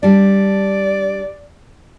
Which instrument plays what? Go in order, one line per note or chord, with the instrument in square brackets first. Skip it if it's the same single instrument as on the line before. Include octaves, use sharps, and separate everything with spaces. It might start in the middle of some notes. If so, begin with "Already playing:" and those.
[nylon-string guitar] G3 D4 [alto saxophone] D5